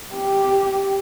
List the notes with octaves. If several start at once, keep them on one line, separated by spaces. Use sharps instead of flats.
G4